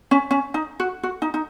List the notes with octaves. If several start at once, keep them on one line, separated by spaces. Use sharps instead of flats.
C#4
C#4
D#4
F#4
F#4
D#4
D#4